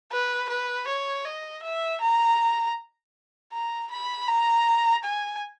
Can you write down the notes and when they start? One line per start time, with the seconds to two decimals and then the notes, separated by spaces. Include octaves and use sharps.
0.12 B4
0.49 B4
0.88 C#5
1.25 D#5
1.63 E5
2.01 A#5
3.52 A#5
3.91 B5
4.28 A#5
5.04 G#5